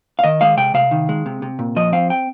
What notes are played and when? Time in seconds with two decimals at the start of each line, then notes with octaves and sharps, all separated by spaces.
0.19 F5
0.24 D#3 D#5
0.41 G#3 F5
0.57 C3 G5
0.74 C3 F5
0.91 D#3
1.09 G#3
1.26 C3
1.42 C3
1.59 A#2
1.76 F3 D#5
1.93 C4 F5
2.10 G5